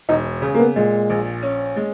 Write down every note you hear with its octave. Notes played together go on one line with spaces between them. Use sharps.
E1 D#4
C#3
A#3
B3
A#2 G#3
A#1
C#4
G#3